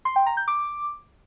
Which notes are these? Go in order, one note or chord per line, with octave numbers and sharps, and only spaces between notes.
C6
G5
A#5
G6
D6